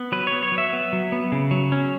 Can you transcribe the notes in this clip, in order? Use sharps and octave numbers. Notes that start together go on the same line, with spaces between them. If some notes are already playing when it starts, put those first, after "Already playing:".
Already playing: B3
F#3 B4
C#5
B3
C#5
F#3
E5
B3
F#3
B3
C#3
F#3
C#4